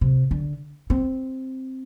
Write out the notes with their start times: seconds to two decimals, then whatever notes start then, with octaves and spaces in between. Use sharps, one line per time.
0.01 C3
0.31 D3
0.90 C4